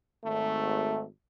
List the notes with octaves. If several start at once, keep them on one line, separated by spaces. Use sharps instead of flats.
G#1 A3